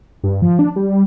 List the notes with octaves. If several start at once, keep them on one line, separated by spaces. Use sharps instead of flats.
G2
F3
D4
G3
G3